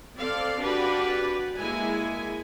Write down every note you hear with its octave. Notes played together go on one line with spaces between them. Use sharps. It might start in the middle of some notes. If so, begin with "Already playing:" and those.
C4 A4 D5 F5
D4 F#4 G4 B4 D5
G#3 A#3 E4 G#5